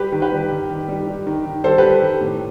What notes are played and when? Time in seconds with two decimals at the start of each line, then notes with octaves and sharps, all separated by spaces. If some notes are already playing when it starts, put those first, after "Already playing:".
Already playing: G3 G4 B4
0.12 D#3
0.22 G4 B4
0.32 G3
0.50 D#3
0.69 D#3
0.88 G3
1.07 G3
1.27 D#3
1.45 D#3
1.64 G3 A4 C5
1.78 G3 G4 B4
2.02 D#3
2.21 A2